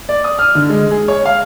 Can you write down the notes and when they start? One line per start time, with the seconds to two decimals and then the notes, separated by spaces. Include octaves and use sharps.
0.09 D5
0.24 D#6
0.39 F6
0.55 D3
0.70 G#3
0.91 G#4
1.08 C#5
1.26 F5